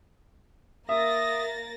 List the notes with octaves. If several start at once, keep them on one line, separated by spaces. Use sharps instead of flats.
A#3 E5 D#6 A6 A#6